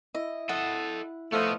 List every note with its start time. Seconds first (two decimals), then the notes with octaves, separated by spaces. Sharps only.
0.15 E4 D#5
0.49 A4 D#5 F#5
1.32 F3 A3 B3 D#5